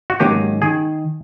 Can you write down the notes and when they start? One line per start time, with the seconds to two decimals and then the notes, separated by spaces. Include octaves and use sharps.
0.10 F#4
0.20 G#2 D#3 F#3 A#3 C#4 G4
0.62 D#3 G#4